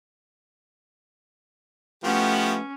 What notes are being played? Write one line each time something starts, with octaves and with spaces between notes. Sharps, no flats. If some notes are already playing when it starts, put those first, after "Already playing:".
F3 A3 B3 C#4 F#4 G4